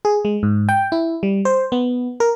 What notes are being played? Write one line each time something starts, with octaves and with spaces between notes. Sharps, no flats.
G#4
G#3
G#2
G5
E4
G3
C5
B3
A#4